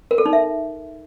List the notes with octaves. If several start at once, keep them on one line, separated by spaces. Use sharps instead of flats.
A#4
A4
D#4
E5